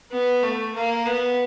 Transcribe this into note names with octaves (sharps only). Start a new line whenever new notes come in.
B3
A3
A#3
B3